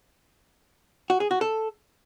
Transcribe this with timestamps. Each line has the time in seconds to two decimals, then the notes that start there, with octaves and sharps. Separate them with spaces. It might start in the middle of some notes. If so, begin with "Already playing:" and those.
1.10 F#4
1.20 G#4
1.31 F#4
1.41 A4